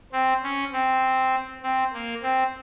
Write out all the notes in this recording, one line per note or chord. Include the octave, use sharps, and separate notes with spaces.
C4
C#4
C4
C4
A#3
C4